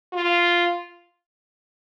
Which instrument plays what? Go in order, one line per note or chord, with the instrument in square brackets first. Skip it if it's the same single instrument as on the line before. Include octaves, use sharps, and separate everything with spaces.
[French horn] F4